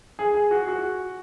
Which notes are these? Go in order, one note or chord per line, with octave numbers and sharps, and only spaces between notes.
G#4
G#4
F#4
F#4